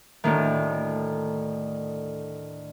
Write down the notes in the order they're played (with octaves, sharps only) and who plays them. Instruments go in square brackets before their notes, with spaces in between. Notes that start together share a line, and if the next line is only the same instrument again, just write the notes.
[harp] D2 A2 D#3